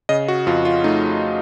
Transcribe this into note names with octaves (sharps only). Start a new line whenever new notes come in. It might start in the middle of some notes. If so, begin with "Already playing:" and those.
C#3 D#5
F#4
F2 F4
F4
A3 D#4